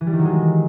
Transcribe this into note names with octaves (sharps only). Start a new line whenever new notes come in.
E3
G3
D#3
F#3
G#3